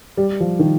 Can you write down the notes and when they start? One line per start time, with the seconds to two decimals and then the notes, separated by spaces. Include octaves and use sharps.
0.17 G3
0.40 F3
0.59 D#3